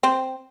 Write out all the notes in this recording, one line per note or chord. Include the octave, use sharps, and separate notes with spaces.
C4